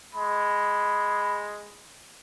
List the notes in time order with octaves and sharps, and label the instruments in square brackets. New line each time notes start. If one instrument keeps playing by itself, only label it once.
[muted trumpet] G#3 [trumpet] B5